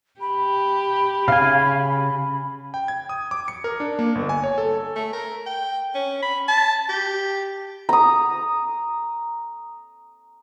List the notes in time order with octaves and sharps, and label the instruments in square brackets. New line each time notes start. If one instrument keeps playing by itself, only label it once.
[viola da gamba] G4 [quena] B5
[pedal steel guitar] C#3 G#5 [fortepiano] F5
[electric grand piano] G5
G#6
D#6
D6
C#7
A#4
D4
A#3
G1
G#5
C#5
A4
[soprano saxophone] A3
A#4
G5
C#4
B5
A5
G4
[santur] A#5 D#6